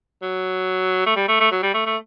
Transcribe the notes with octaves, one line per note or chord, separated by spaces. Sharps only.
F#3
A3
G3
A3
A3
F#3
G3
A3
A3